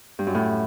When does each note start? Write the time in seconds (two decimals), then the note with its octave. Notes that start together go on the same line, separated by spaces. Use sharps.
0.19 G2
0.27 F#2
0.35 A2